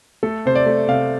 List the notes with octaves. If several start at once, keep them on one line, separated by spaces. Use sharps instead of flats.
A3 A4
C3 C5
D5
A3
C3 F5